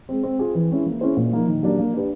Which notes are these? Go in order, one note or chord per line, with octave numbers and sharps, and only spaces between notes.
G#3 C4
C4
F4 G#4
E3
G#3 C#4 E4
A#3
C#4 E4 G#4 C5
A#2
F3 A#3 D#4
D#3
F#3 A#3 D4 G4
A#3
D4 G4 B4